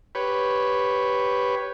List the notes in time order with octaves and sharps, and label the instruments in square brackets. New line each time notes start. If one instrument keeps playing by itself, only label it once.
[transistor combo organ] G4 B4 C#5